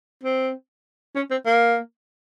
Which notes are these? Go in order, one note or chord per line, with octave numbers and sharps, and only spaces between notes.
C4
C#4
C4
A#3